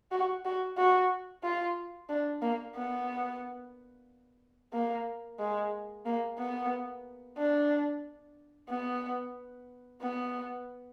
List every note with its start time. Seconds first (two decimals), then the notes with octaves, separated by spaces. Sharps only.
0.11 F#4
0.45 F#4
0.78 F#4
1.43 F4
2.09 D4
2.42 A#3
2.76 B3
4.73 A#3
5.39 G#3
6.06 A#3
6.39 B3
7.38 D4
8.69 B3
10.02 B3